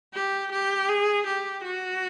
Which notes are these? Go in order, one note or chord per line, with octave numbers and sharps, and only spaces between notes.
G4
G4
G#4
G4
F#4